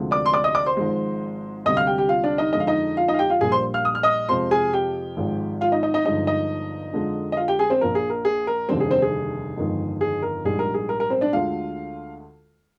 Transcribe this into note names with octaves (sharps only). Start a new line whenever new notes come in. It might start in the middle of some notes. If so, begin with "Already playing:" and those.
Already playing: D2 C3 F3 G#3
D5 D6
C6
D5 D6
D#5 D#6
D5 D6
C5 C6
G#1 G#2 F3 G#3
D2 C3 G3 D#5 D#6
F5 F6
G4 G5
G4 G5
F4 F5
D4 D5
D#4 D#5
F2 D3 F3 G#3 D#5
F5
D#4 D#5
F4 F5
D#4 D#5
F5
G4 G5
F4 F5
A#1 A#2 G3 G#4 G#5
C5 C6
F5 F6
D#6
F6
D#5 D#6
F2 C3 F3 G#3 C5 C6
G#4 G#5
G4 G5
G#1 G#2 F3 G#3
F4 F5
D#4 D#5
D#4 D#5
D#4 D#5
G1 G2 F3 G#3 D#4 D#5
D#4 D#5
F2 D3 F3 G#3
D#5
F4 F5
G4 G5
G#4 G#5
C4 C5
A#1 A#2 F3 A#4
G#4
A#4
G#4
A#4
F1 D#2 D3 G3 C4 C5
G#4
C4 C5
G#4
G1 F2 D#3 G#3
G#4
A#4
A#1 G#2 G3 G#4
A#4
G#4
A#4
A#4
C4 C5
D4 D5
D2 D3 G#3 F4 F5